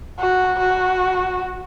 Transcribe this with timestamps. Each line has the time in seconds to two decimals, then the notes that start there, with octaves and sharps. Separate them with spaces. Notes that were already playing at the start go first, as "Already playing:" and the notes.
0.19 F#4
0.59 F#4